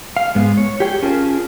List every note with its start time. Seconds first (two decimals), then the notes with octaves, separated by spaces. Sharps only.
0.17 F5
0.35 G#2 G#3 B3
0.57 C#5
0.80 G4 G#4 C#5 G5
1.02 C#4 F4 G#4 A#4 A5